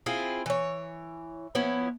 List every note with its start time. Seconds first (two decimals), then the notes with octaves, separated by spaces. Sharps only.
0.06 C4 E4 F4 G#4
0.46 E3 C#5
1.55 F3 B3 C#4 E4